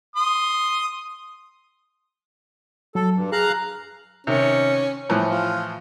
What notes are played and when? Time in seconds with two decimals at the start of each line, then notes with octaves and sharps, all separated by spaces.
0.16 C6 D#6
2.95 F#3 A4
3.14 G2
3.32 G#4 F5 A#5 F#6
4.27 C3 D#3 C#4
5.09 A2 E3 F3
5.31 F4